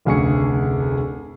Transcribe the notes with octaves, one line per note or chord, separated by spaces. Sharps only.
F1 D2 C#3 G#4 C#6 C#7